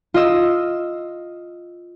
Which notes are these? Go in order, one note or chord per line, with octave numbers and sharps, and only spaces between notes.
F4 D#5 E6